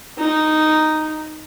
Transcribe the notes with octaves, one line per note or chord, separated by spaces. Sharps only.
D#4